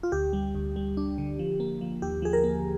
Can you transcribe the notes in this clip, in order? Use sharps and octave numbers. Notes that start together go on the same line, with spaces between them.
F4
D2 G4
G3
D2
G3
D4
D3
F3
A#3
F3
D#2 G4
F3 G#4
A#4
A#3